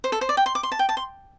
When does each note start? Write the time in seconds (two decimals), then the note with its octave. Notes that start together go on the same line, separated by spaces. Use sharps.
0.04 C5
0.12 A4
0.21 C5
0.29 D5
0.37 G5
0.46 C6
0.55 D6
0.63 C6
0.72 A5
0.79 G5
0.89 A5
0.97 C6